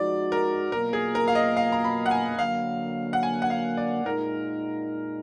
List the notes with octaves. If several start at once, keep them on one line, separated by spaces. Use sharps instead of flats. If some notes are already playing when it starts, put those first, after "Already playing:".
Already playing: F3 G#3 D#4 F#4 D5
A#4
B2 F#3 A#3 F4 A#4
G#4
A#4
F5
D#5
F5
A#5
B5
F#5
G#5
D3 F#3 A#3 F5
F#5
G#5
F#5
F5
D5
A#2 G#3 D#4 A#4